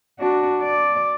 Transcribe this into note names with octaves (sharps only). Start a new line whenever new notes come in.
D4 F#4
D5